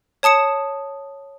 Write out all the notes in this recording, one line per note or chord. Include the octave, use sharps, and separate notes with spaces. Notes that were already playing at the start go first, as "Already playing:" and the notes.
C#5 A5 D#6 C#7 E7